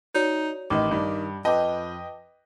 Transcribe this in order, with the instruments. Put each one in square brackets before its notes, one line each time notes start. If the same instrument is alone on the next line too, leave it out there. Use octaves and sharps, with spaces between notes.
[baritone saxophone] D#4 [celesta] F#4 C#5 D5
[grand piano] A1 [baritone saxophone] D#3 [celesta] D#5 D6
[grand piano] G2 [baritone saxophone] D#3
[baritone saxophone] F2 [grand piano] B4 D#5 G5 [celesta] A5 D6